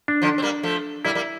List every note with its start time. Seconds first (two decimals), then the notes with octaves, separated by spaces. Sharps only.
0.08 D4
0.22 D3 F3
0.38 C4
0.42 G3 A#3
0.63 F3 A3
1.05 G3 A#3 E4
1.15 G3 A#3